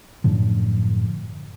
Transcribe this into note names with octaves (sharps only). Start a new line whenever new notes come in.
F#2 A2 D3 F3